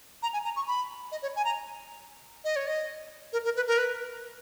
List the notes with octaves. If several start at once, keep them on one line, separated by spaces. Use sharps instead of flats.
A#5
G#5
A#5
C#6
B5
D#5
C#5
G#5
A#5
D#5
C#5
D#5
A#4
A#4
B4
A#4
B4